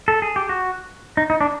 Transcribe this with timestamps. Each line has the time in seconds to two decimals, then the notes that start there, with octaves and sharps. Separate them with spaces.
0.08 A4
0.22 G#4
0.36 G4
0.49 F#4
1.17 D#4
1.30 D#4
1.41 D4